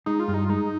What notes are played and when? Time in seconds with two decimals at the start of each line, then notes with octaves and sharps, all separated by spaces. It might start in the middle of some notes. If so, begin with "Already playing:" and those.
0.06 G#3 D#4
0.20 F4
0.28 G2
0.34 D#4
0.45 F4
0.50 G#3 D#4